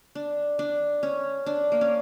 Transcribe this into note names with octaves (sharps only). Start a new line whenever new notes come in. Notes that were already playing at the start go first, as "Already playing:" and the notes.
D4
D4
C#4
D4
A#3
C#4